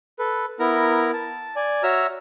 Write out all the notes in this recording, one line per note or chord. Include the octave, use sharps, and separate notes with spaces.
A4 B4
B3 E4 A#4 A#5
A5
D5 G#5
F#4 C#5 E5 A#5 E6 F6